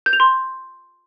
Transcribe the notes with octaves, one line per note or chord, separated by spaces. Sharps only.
G6
F7
C6